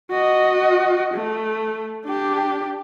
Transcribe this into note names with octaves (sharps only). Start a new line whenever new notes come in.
F#4 D#5
A3
D4 G4